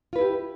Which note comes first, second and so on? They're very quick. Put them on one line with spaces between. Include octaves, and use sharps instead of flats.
F4 B4 E4 G4